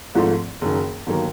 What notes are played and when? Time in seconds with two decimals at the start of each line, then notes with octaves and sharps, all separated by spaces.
0.15 G#1 G#2 F3 A3
0.61 F#1 F#2 D#3
1.06 G1 D#3 F#3 A#3